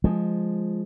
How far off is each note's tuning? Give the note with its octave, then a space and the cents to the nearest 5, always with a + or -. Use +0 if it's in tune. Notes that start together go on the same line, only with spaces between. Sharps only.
F3 +0 G#3 +0